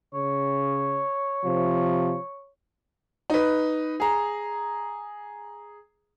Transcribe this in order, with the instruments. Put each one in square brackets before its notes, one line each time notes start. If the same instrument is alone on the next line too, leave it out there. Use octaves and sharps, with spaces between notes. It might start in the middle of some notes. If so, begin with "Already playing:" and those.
[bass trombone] C#3 [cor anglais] C#5
[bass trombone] C3 [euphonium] F3
[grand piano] D#4 B4
G#4 A#5